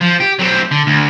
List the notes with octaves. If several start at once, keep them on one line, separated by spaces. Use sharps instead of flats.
F3
G4
F#3 C4
D3
D2